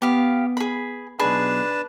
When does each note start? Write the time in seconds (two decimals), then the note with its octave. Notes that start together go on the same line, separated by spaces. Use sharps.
0.02 B3 G4 F5
0.57 G#4 B5
1.19 B1 F#2 D4 G#4 B4 A5 B5